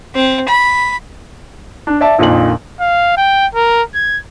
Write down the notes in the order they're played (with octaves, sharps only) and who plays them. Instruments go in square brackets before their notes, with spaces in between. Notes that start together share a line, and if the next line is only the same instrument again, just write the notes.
[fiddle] C4
B5
[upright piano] D4
D5 E5 A5
A#1 F2 A#2 D#3 F#7
[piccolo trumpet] F5
G5
A#4
G#6